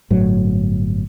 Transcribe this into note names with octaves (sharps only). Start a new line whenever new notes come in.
G1 A2 F#3